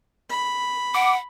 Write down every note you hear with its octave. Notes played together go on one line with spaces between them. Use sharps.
B5
F#5 D6